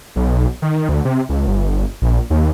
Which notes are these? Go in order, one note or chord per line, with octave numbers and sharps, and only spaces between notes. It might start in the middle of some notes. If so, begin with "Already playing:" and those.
B1
D#3
D2
C3
C#2
G1
A#1
D#2